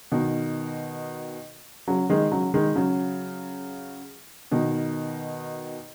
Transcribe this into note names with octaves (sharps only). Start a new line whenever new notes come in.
B2 D#3
C#3 F#3
D#3 G#3
C#3 F#3
D#3 G#3
C#3 F#3
B2 D#3